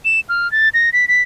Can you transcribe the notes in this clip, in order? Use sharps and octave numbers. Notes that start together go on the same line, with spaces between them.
E7
F6
A6
A#6
B6
B6